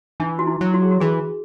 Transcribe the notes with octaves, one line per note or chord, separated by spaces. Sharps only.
E3 D4
F#4
E4
F#3
F#4
G#4
F#4
E3 G#4